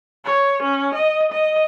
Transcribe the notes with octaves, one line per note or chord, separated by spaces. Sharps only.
C#5
C#4
D#5
D#5